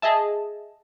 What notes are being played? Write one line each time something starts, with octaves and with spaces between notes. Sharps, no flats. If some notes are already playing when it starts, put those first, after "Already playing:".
G#4 D#5 E5 A5